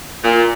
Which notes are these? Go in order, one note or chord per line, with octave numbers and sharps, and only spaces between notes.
A#2